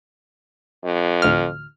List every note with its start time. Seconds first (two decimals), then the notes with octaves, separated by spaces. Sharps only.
0.84 F2
1.22 A1 D2 F6